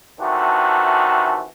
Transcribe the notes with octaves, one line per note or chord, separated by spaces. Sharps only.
C3 D#3 E3 A3 D4 F#4